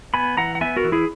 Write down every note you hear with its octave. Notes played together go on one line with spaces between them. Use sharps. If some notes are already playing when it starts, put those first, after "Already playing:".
B3 G#5 B5
E3 F#5 A#5
F#5
B3 E5 G#5
F#4 A#4
E3
E4 G#4